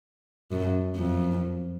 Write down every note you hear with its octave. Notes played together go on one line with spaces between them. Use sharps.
F#2
F2